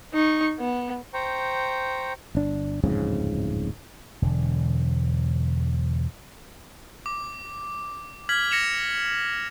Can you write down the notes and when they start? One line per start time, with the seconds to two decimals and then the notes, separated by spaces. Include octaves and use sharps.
0.14 D#4 C#6
0.60 B3
1.14 C5 G5 A#5 C#6
2.35 G1 D4
2.83 D1 F2 G#2 C#3
4.22 E1 D3
7.06 D6
8.29 F6 G#6 B6 F#7
8.51 A#6 C#7 E7 F7